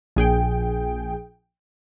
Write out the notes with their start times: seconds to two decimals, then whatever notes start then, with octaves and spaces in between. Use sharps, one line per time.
0.16 A#1 G#4 G5